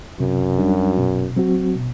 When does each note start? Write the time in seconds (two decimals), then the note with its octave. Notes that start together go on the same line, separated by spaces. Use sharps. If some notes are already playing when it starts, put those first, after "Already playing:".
0.20 F#2 C3
0.59 G3 D4 F#4
0.98 B2
1.36 F#3 C4 F#4
1.75 B2